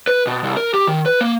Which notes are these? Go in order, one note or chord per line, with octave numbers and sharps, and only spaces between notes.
B4
B2
C2
A#4
G4
D#3
B4
A#3